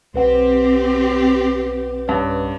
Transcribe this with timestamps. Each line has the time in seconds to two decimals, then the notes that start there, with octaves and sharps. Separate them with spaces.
0.14 B1 C4 G4 B4 F#5
2.08 G2 C#4